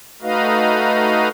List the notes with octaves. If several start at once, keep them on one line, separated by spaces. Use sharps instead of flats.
A3 D#4 F#4 B4 D#5 F5